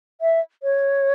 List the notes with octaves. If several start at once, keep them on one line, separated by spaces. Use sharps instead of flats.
E5
C#5